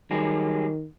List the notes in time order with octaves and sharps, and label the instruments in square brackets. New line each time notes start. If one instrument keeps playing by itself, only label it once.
[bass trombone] D#3 [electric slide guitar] F#3 G3 G#4